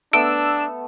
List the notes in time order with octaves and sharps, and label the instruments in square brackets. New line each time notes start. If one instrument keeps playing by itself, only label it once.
[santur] A3 B3 [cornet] D4 [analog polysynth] E6 [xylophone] D7